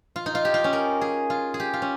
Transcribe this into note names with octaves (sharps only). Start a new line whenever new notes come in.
F4
D#4
F4
G4
F4
C#4
A#4
G#4
F4
G#4
G4
F4
C#4